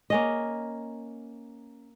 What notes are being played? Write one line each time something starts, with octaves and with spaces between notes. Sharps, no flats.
A#3 C#4 D#5